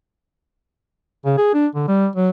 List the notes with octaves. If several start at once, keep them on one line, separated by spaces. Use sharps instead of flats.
C#3
G#4
D4
D3
G3
F#3